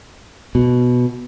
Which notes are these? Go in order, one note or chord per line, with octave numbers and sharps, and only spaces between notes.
B2